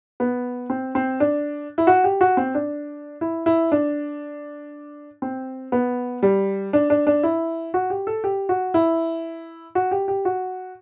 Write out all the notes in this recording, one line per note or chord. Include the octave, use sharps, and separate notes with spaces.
B3
C4
C4
D4
E4
F#4
G4
F#4
C4
D4
E4
E4
D4
C4
B3
G3
D4
D4
D4
E4
F#4
G4
A4
G4
F#4
E4
F#4
G4
G4
F#4